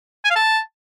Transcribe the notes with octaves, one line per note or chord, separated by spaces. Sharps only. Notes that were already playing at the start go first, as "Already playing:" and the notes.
G#5
F5
A5